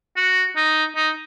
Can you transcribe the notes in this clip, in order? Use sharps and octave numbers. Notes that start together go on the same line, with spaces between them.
F#4
D#4
D#4